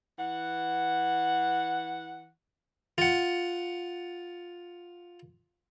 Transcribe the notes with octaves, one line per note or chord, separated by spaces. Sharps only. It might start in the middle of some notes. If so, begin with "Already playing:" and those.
E3 F#5
F4 F#5